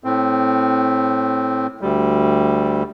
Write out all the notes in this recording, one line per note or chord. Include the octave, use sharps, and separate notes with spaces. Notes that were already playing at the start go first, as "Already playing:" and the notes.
A2 C4
D2 G3